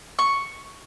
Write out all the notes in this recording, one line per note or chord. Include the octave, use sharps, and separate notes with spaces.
C#6